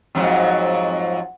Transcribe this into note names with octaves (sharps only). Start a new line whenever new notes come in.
F2 G#2 F#3